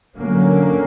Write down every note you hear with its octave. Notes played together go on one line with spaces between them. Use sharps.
D3 F#3 A#3 C#4